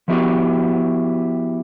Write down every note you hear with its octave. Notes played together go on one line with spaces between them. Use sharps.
F3 B3 E4 F#4 G4